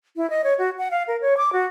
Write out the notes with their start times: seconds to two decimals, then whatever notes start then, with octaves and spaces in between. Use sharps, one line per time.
0.16 E4
0.30 D#5
0.44 C#5
0.59 F#4
0.78 F#5
0.91 F5
1.08 A#4
1.21 C#5
1.37 D6
1.53 F#4